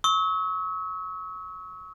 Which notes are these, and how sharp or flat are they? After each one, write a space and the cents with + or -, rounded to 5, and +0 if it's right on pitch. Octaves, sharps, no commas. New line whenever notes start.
C#6 +0 E6 -40